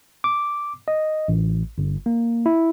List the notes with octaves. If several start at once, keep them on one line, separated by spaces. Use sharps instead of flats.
D6
D#5
A1
G1
A#3
E4